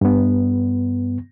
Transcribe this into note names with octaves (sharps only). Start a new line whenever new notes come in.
G2 B3